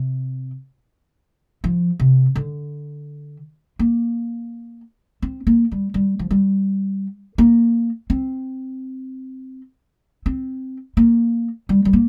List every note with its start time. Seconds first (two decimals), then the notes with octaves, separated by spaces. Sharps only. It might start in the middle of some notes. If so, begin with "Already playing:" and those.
Already playing: C3
1.64 F3
2.00 C3
2.36 D3
3.79 A#3
5.22 C4
5.47 A#3
5.72 G3
5.94 G3
6.19 F3
6.31 G3
7.38 A#3
8.10 C4
10.26 C4
10.97 A#3
11.69 G3
11.85 G3
11.93 A#3